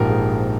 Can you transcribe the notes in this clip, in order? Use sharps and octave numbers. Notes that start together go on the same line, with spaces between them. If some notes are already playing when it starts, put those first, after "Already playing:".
Already playing: A#1 G#2 F3 G4 A#4
G#4